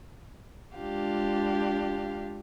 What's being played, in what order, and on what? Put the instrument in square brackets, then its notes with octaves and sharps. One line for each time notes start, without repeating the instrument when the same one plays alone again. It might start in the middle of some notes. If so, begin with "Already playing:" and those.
[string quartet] G#3 D4 F4 G4 F5